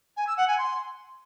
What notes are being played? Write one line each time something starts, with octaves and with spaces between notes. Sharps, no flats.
G#5
E6
F#5
G#5
C6